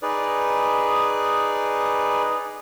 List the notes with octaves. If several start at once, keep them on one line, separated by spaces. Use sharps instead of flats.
D#4 G#4 B4 D5